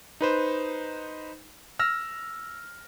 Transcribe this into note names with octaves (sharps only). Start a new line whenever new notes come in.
D#4 B4 C5
E6 F6 A#6